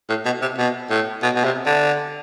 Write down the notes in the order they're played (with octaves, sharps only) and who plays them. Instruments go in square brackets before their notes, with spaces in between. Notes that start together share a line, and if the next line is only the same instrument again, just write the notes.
[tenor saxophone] A2
B2
C3
B2
A2
B2
B2
C3
D3